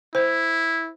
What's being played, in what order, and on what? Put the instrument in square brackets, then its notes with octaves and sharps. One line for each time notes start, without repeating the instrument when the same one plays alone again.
[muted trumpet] E4 [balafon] C5